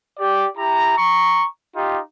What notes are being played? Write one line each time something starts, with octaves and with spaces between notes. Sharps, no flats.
G4 D5
E4 G4 A#5
A#5 C#6
D#4 F4 G4